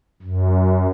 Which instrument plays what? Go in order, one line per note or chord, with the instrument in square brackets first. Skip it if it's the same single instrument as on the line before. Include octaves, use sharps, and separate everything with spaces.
[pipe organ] F#2